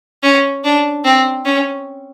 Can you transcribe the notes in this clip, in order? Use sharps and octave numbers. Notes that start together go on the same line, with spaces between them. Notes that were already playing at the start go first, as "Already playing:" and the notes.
C#4
D4
C4
C#4